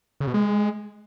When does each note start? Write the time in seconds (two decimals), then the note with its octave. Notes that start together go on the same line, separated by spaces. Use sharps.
0.20 C#3
0.27 B2
0.34 G#3